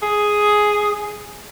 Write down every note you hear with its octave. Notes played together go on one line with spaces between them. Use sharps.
G#4